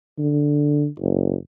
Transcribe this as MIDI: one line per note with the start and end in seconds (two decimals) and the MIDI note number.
0.18 0.87 50
1.00 1.35 30